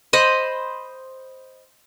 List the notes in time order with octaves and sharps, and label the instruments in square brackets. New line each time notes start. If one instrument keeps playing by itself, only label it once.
[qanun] C5 D#5 B5